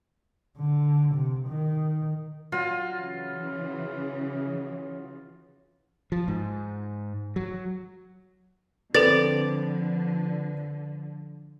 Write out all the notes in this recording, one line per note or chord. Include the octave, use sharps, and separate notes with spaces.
D3
C3
D#3
F#3 F4
C#3 E3
F3
G#2
F#3
D3 F3 C4 A4 B4 D5 A6